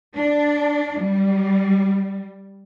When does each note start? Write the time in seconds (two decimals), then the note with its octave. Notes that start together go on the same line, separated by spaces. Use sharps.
0.15 D4
1.00 G3